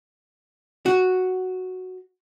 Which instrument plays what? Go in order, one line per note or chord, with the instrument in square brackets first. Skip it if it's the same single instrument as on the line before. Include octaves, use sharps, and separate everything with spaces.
[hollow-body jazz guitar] F#4